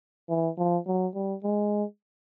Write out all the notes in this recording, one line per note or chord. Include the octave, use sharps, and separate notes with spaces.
E3
F3
F#3
G3
G#3